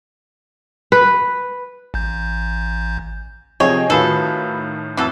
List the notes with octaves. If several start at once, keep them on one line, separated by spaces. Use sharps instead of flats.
B4
A1 G6
C3 F3 G#4 C#5 D#5 G5
A2 D#3 F4 F#4 G#4 A4 B4
F2 E3 F#3 A4